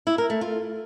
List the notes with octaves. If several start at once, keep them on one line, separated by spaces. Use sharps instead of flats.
E4
A#4
A3
F4